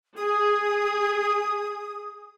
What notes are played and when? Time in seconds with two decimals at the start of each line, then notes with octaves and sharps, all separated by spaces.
0.17 G#4 D#6